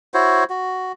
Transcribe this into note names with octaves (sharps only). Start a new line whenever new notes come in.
E4 F#4 C5 C#5
F#4